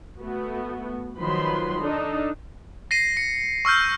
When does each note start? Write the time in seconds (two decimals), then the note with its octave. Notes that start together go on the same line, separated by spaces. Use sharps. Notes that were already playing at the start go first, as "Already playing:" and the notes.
0.22 A3 B3 F#4
1.18 D#3 F3 F#3 B4 B5 C6
1.79 D4 D#4 A4
2.91 A#6 C7 D#7
3.17 C#7
3.65 C#6 E6 F6 G6